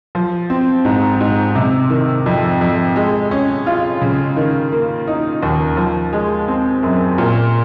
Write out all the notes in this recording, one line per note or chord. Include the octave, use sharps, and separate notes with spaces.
F3
C4
G#2
G#2
C3
D#3
F2
F2
G#3
C#4
F4
C#3
D#3
A#3
D#4
D#2
F3
G#3
C4
F#2
A#2